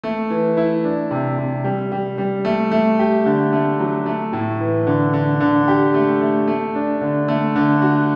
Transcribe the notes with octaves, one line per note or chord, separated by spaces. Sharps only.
A3
E3
E4
D4
C3
C3
G3
G3
G3
A3
A3
G4
D3
A3
F#3
A3
A2
E3
D3
D3
D3
G4
A3
A3
A3
D4
D3
A3
D3
F#4